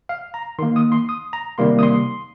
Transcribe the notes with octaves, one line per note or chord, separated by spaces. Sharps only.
F5
A#5
D#3 A#3 C6
D#6
C6
D#6
A#5
C3 D#3 G3 A#3 C6
D#6
C6